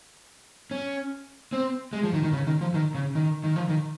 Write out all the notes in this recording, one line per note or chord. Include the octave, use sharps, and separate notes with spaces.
C#4
C4
G#3
F3
D#3
D#3
C#3
D#3
F3
D#3
C#3
D#3
D#3
F3
D#3